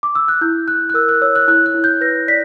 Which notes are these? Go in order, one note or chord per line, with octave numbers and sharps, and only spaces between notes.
D6
E6
F#6
E4 G6
E4 F#6
F#6
A#4 E6
F#6
C#5 E6
F#6
E4 F#6
F#6
E4
G6
B4 A#6
D5 B6